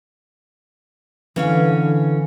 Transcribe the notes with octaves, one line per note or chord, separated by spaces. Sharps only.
D3 E3 C#4 F5